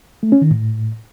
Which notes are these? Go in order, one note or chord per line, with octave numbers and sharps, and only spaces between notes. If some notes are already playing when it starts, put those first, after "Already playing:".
A3
C#4
D#3
A2